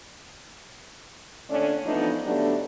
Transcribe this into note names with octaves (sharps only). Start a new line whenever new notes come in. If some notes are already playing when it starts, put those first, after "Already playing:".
A#2 D3 A3 C#4 D4
E3 F3 A3 B3 D4 D#4
D3 F#3 G3 A3 B3 D4